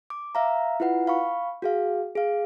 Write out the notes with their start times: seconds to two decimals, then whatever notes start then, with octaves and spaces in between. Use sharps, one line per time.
0.10 D6
0.35 E5 F5 A#5
0.80 E4 F4 B4 F#5
1.07 F5 B5 C#6
1.62 F#4 G#4 F5
2.15 G#4 F5